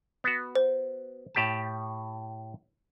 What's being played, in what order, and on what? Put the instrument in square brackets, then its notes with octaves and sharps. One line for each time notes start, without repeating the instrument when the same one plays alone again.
[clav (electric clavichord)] B3 F#4
[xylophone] C5
[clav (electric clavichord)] A2 G4 A5